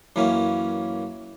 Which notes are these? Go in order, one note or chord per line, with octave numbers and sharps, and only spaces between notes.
F#2 E3 A#3 C#4